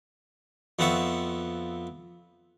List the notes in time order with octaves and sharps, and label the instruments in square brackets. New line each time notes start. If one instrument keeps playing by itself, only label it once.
[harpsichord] F2 B3 C4 F4 E5 C#6